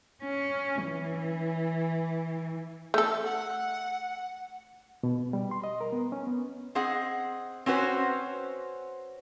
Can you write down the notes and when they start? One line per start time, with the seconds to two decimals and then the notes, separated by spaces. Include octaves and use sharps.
0.23 C#4
0.87 E3
2.94 A3 A4
3.25 F#5
5.03 B2
5.33 G3
5.51 C6
5.64 D#5
5.81 A#4
5.93 B3
6.12 C#4
6.27 B3
6.75 C4 G#4 D#5 F#5
7.66 C4 C#4 F#4 B4 C5